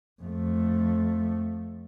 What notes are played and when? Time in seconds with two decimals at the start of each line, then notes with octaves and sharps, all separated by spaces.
0.22 F2 A3